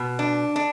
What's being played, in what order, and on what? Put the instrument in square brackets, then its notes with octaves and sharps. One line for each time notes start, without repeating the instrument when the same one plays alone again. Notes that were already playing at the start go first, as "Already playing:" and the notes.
Already playing: [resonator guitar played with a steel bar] B2
D4
D4